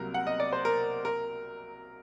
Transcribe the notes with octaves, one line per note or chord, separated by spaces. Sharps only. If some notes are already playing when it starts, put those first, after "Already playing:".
Already playing: C2 C3 F#3 A#3 A#4
F#5
D#5
D5
C5
A#4
A#4